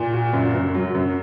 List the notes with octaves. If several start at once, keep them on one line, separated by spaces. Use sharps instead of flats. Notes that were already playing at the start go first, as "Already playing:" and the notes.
Already playing: A#2
F#4
F#2
F#2
F#3
F#2